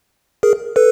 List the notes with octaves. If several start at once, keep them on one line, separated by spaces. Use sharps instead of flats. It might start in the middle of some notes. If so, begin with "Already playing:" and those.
G#4 A#4
A4 B4